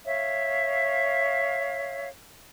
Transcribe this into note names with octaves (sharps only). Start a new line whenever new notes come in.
C#5 E5 F5